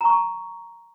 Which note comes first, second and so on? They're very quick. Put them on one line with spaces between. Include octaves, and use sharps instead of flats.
A#5 C#6 A5